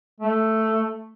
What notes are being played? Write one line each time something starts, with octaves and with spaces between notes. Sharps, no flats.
A3